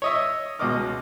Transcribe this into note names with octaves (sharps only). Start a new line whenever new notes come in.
C#5 D#5 E5
C#2 B2 D#5 D6 F6